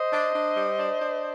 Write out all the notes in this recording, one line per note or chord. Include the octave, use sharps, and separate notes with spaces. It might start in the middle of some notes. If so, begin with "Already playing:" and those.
Already playing: C5 D#5
D4
D4
G3
D4
D4